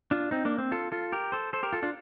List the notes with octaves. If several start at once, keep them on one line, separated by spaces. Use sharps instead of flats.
D4 F4
C4 D#4
A#3 D4
C4
F4 A4
F4 A4
G4 A#4
A4 C5
A4 C5
G4 A#4
F4 A4
D4 F4